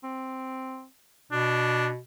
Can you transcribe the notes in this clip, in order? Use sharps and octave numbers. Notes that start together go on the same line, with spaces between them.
C4
B2 D4